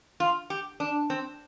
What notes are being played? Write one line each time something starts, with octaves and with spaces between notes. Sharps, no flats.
F4
G4
D4
C4